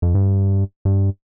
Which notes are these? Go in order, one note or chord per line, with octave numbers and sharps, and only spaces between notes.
F2
G2
G2